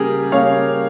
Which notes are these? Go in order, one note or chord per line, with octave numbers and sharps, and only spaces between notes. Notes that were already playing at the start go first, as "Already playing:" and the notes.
Already playing: C#3 G3 A#3 G4 G#4 A#4
C#3 G3 A#3 C#5 F5